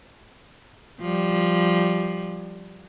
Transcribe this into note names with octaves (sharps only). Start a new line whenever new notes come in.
F3 G3